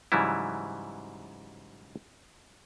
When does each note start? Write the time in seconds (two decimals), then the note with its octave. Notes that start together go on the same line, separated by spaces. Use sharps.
0.12 G#2 C#3 E3 F#3 G3 E4